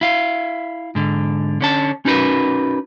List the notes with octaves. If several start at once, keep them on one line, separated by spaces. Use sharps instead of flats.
E4 F5
G#2 D3
D3 C#4 A5
C#4 D#4 F#4 A#4 B4